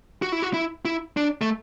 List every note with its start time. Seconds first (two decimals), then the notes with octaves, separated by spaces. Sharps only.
0.22 F#4
0.32 E4
0.42 F#4
0.54 E4
0.85 E4
1.17 D4
1.41 A3